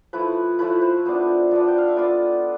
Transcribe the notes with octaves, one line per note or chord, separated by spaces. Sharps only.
F3 A3 E4 B4
F3 A3 E4 B4
C5
F3 B3 D4
F3 B3 D4
G5
F5
E5
B3 F4 D5